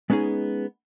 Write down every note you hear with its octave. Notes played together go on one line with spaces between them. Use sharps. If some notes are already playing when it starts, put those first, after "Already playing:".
G#3 B3 C#4 D#4 G#4